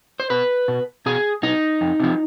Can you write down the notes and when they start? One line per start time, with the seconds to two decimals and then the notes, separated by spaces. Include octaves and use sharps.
0.20 C5
0.30 B2 B4
0.68 B2
1.06 B2 G#4
1.43 B2 D#4
1.81 F2
2.00 C3 F3